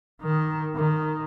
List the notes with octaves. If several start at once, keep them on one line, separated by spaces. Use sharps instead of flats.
D#3
D#3